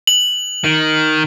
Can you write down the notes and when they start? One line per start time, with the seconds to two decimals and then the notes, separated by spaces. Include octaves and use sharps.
0.07 F#7
0.64 D#3